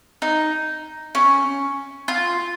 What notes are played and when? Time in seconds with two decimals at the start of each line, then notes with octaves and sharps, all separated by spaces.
0.22 D#4
1.15 C#4
2.08 F4